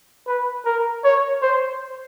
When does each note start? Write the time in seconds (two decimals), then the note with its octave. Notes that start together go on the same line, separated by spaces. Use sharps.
0.27 B4
0.65 A#4
1.04 C#5
1.42 C5